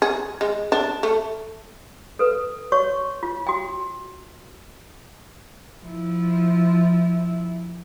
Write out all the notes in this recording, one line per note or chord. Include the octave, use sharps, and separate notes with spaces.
G#4
G#3
D4
A3
A4 B4
F#4 C#5 C#6
F4
F#4 G5
F3 E4